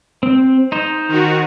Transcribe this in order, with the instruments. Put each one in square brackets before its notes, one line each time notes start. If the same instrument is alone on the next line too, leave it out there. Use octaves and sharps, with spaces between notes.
[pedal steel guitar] C4
D#4 C5
[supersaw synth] D#3 F#4